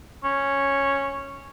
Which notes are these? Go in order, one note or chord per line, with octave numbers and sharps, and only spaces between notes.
C#4